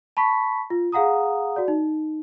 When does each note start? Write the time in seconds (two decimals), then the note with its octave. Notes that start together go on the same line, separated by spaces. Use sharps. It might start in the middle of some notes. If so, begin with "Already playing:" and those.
0.17 A5 B5 C#6 B6
0.70 F4
0.92 G#4 F5 F#5 A#5 D#6
1.56 F#4 D5
1.68 D#4